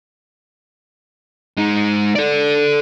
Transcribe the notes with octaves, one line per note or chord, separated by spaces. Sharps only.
G#3 D#4
A4 D5